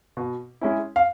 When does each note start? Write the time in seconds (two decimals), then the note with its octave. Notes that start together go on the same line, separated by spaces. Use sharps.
0.17 B2
0.61 G#3 C#4 E4
0.96 F5